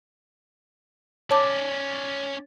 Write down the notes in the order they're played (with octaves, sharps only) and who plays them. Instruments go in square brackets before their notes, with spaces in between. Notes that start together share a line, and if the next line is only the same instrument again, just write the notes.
[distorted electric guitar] C#4 D5 [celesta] C#5 [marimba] A5 D6